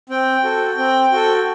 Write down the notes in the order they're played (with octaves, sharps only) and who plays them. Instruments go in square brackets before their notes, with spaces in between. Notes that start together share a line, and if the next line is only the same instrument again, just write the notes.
[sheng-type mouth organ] C4 G5
F#4 A4
C4
F#4 A4